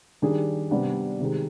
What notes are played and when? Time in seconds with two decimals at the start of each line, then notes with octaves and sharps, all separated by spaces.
0.22 D#3 G3 D4 G#4
0.71 C3 G3 B3 D4
1.20 C3 D#3 G#3